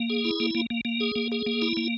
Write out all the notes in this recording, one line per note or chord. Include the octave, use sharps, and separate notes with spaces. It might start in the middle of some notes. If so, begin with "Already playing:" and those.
Already playing: A#3
G#4
E4
A#3
A#3
A#3
A#3
G#4
A#3
G#4
A#3
E4
A#3